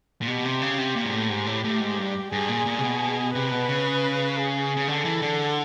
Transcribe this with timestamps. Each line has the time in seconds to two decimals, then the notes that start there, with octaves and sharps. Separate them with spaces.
0.22 A#2
0.27 B2 G4
0.45 C3
0.62 C#3
0.78 C3
0.96 A#2
1.05 G#2
1.13 A2
1.29 G#2 G4
1.46 A2
1.64 A2
1.80 G#2
1.98 G2
2.32 G2 G#4
2.49 A#2
2.66 A#2
2.79 C3
2.83 B2
3.34 C3 B4
3.51 B2
3.69 C#3
4.37 G#4
4.77 C#3
4.88 D3 A4
5.05 E3
5.22 D3